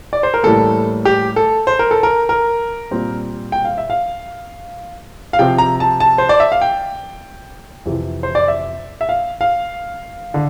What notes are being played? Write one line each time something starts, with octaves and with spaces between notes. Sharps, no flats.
D5
C5
A#4
A2 E3 G3 A#3 A4
G4
A4
C5
A#4
A4
A#4
A#4
A#2 G3 C4
G5
F5
E5
F5
F5
C3 F3 C4 G5
A#5
A5
A5
C5
D5
E5
F5
G5
F2 C3 E3
C5
D5
E5
E5
F5
F5
D3